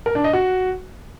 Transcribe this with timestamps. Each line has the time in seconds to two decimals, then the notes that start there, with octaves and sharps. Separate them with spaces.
0.06 A#4
0.15 D4
0.24 D#5
0.33 F#4